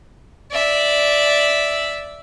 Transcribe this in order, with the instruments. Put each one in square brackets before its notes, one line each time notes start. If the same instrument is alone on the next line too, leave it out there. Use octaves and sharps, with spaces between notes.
[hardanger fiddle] D5 E5